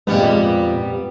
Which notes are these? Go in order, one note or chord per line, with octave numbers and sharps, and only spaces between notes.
F2 A#2 G3 G#3 B3